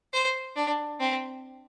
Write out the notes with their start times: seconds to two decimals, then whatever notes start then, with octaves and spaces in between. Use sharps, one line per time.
0.13 C5
0.56 D4
1.00 C4